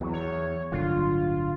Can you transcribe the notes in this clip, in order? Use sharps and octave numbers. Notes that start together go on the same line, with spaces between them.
E2 F#3
C#5
D1 G1 D3 F4